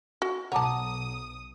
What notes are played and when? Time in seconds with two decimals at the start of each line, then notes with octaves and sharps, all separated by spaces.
0.22 F#4
0.52 B1 C#5 F#5 A5 A#5 D6 D#6